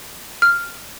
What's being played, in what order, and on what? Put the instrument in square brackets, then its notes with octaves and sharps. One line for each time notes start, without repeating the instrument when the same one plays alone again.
[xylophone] F6